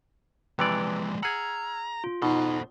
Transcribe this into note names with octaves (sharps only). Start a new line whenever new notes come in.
C3 E3 F3 G#3 B4 D5
G#4 F#5 A#5 E6 F6 G#6
F4
B2 D#4 A4 C5